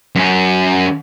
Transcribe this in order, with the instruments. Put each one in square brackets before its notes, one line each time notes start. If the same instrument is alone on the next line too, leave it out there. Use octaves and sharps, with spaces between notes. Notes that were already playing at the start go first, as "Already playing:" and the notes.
[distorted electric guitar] F#2 C#4